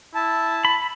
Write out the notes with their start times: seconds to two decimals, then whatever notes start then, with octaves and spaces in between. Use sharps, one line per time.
0.15 E4 A5
0.65 B5